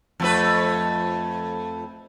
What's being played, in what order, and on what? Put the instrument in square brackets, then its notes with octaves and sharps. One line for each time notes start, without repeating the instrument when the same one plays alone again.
[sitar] F2 A3 B4